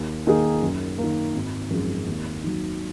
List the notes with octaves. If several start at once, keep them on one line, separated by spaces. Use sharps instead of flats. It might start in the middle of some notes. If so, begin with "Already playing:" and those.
Already playing: D#2
D#3 A#3 D#4 G#4
F#2
A#3
D#3
G#1
F#2 F3 G#3
D#2
D#3 F#3